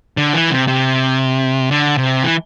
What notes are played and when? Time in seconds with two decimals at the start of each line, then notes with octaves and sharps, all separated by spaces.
0.17 D3
0.33 E3
0.51 C3
0.68 C3
1.71 D3
1.98 C3
2.23 E3